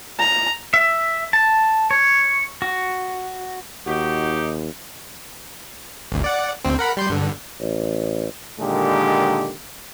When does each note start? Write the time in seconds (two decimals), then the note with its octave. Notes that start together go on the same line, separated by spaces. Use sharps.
0.19 A#5
0.74 E5
1.33 A5
1.91 C#5
2.62 F#4
3.87 D#2 D#4 F#4 G4
6.12 G#1 D2
6.24 D5 F#5
6.64 D2 C4
6.79 A#4 F#5 B5
6.97 G3 C6 G6
7.09 G2 D3
7.61 A1
8.60 A#2 D3 D#3 G#3 G4